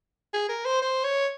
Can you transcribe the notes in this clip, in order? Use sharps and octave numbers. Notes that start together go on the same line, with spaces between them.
G#4
A#4
C5
C5
C#5